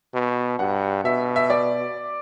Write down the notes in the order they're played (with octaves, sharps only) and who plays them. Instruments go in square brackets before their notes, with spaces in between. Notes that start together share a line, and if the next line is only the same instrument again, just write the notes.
[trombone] B2
[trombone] G2 [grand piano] F#5
[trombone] B2 [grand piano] E5
[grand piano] E5
D5